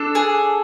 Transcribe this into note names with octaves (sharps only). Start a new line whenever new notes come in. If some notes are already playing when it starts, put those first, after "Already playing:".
Already playing: D4 A4
G#4